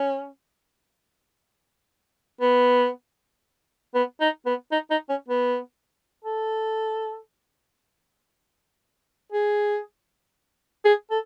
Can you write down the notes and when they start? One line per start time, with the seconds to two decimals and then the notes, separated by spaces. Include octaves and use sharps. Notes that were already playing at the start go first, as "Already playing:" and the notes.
Already playing: C#4
2.41 B3
3.95 B3
4.21 D#4
4.46 B3
4.72 D#4
4.91 D#4
5.09 C#4
5.28 B3
6.24 A4
9.32 G#4
10.85 G#4
11.10 A4